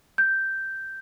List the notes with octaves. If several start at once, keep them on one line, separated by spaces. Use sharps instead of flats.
G6